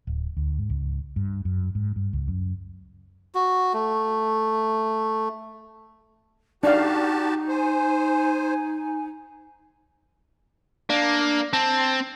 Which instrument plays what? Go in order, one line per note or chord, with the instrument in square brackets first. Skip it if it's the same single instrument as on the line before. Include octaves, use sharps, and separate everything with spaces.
[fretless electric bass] D1
D2
G#2
C#2
G2
F#2
G#2
G2
C#2
F#2
[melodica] F#4
A3
[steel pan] D4 F5 [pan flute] D#4 [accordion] F#4 G4 A5
[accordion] C5 [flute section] G#5
[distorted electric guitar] A#3 [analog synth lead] D4
[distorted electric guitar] C4 [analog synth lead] A5